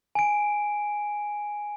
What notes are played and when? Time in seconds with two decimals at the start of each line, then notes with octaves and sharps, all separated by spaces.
0.15 G#5 D7